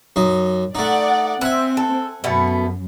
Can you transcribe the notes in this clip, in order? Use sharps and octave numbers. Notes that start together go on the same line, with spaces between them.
F#2 D#4
A3 D#4 D5 F#5
C4 E5 F#5 G#5
A4
F#2 B2 A3 B3